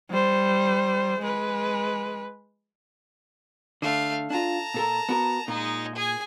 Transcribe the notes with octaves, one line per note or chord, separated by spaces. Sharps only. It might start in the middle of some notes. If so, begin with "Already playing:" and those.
G3 C5
G#3 B4
D3 A3 F5
D4 F4 A5 A#5
A#2 A4 A#4
B3 F#4 A#4
A#2 G#3 D#4
G#4 G#5